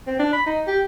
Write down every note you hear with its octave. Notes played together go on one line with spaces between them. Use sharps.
C4
D4
B5
D#4
G4